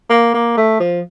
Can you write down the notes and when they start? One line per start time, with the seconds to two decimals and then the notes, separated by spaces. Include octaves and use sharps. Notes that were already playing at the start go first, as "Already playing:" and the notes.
0.10 A#3
0.34 A#3
0.57 A3
0.80 F3